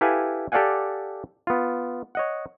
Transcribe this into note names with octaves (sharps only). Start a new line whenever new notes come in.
E4 G4 A4 B4 F5 G#5
G4 A4 D5 F5 F#5 G#5
B3 F4
C#5 D#5 F#5